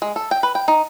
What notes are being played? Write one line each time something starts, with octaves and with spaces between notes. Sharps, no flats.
G#3
A4
G5
B4
G5
D#4